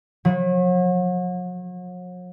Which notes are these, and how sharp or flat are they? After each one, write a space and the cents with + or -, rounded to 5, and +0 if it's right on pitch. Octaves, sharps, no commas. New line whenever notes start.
F#3 -40